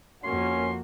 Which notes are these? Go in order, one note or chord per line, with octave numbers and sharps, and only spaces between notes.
F2 A#3 C#4 F#4 C6